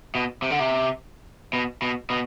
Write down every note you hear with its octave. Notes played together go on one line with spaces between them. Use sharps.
B2
C3
D3
C3
B2
B2
B2